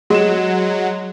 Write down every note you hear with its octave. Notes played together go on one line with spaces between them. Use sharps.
F#3 G#3 E7